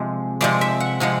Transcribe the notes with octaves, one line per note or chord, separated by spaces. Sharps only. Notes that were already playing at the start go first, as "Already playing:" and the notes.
Already playing: C3 F3 G#3
C3 F3 G#3 D5
E5
F#5
C3 F3 G#3 F#5